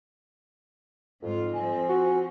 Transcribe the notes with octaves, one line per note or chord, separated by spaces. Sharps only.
F2 G#2 F4
F3 C4 G#5
F#4